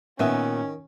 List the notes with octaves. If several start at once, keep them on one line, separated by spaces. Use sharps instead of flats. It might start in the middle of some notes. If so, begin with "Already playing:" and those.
A#2 D#3 B3 C#4 E5 G#5